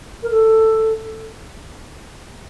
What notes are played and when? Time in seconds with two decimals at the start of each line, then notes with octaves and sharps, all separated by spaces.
0.23 A#4
0.31 A4